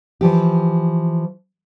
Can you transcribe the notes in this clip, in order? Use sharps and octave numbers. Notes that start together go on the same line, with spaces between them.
E3 F3 G4